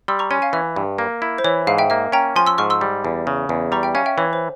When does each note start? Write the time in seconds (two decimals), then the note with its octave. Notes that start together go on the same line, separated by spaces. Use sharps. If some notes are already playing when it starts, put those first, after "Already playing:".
0.08 G3 C6 E6
0.19 A#5 C#6
0.31 C#4 G#5 C6
0.42 F5 G#5
0.53 E3 E5
0.76 G2
0.98 A#3
1.22 E4
1.38 C5
1.44 E3 C#5
1.67 G#2 F5
1.78 E5 G5
1.90 A#3 E5
2.12 C#4 G5 A#5
2.36 F3 G#5 C6
2.46 C6 E6
2.58 G#2 C#6 F6
2.70 C6 E6
2.81 G3
3.05 E2
3.27 C#3
3.49 E2
3.72 G3 A#5 C#6
3.83 E5 G5
3.95 C#4 F5 G#5
4.06 E5 G5
4.18 E3 C#5
4.33 C5